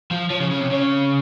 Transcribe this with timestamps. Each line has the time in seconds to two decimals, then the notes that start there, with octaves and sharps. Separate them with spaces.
0.11 F3
0.30 F3 C#5
0.40 C#3
0.50 C#3
0.60 C3
0.70 C#3 C#5